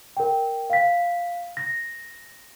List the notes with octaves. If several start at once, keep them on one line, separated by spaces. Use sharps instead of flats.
A#4 G5
F5 B6
A#6